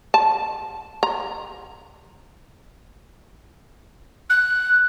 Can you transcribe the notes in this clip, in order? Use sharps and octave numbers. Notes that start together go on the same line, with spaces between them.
A5
A#5
F#6